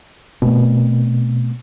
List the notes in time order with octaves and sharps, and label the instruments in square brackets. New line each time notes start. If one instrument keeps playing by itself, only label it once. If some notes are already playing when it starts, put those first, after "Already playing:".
[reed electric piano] B2 [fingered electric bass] A3 C4